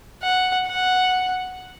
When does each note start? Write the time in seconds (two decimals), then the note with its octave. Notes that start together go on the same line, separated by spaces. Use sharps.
0.22 F#5
0.67 F#5